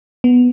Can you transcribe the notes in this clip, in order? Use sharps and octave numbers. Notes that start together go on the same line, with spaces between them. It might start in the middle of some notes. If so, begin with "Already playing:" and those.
B3